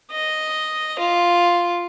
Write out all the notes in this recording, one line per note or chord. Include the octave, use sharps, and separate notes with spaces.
D#5
F4